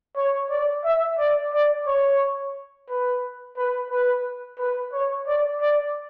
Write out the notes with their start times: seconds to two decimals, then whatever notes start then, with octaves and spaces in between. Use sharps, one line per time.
0.17 C#5
0.50 D5
0.85 E5
1.18 D5
1.53 D5
1.87 C#5
2.89 B4
3.57 B4
3.91 B4
4.59 B4
4.93 C#5
5.27 D5
5.61 D5